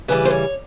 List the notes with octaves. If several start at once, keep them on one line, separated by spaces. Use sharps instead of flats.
C#3 E3 G3 B4
C5
C#5